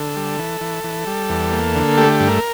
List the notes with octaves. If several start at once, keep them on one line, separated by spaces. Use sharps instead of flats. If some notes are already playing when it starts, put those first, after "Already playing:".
Already playing: D3 A4
G3
E3
E3
E3
G3
E2
A#3
D3
A3 G4
G2
A#4